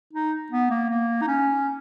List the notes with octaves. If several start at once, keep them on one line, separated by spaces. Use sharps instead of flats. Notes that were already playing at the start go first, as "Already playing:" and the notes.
D#4
B3
A#3
A#3
D#4
C#4